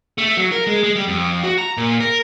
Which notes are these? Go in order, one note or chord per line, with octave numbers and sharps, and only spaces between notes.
A3
F#3
A#4
G#3
G#3
G3
F2
F#4
A#5
A#2
A#4